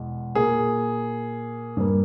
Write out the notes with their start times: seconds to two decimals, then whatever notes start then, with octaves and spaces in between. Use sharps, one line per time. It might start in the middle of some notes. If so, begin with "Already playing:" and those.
Already playing: E2 B2 G#3
0.35 A#2 A#3 G#4
1.77 G2 G3 A#3